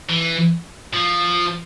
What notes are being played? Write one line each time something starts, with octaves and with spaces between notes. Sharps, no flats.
E3
F3